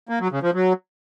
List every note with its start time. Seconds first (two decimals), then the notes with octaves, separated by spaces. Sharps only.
0.09 A#3
0.20 F#3
0.32 C#3
0.43 F3
0.54 F#3